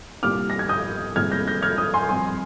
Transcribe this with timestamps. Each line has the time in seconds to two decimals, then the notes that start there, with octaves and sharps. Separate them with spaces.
0.23 C2 A#2 G3 A#3 D6 F6
0.50 A#6
0.59 G#6
0.69 D#6 G6
1.16 C2 A#2 G#3 C4 F6 G#6
1.31 G6 A#6
1.47 G6 A#6
1.62 F6 G#6
1.78 D#6 G6
1.94 G#5 C6
2.09 G2 F3 C4 G#5 C6